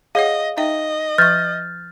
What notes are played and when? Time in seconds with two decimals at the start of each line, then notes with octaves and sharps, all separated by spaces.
0.15 G#4 C#5 D#5 F5 F#5
0.57 D#4 D#5 E5 G5
1.18 F3 E5 C#6 F6 G6 A6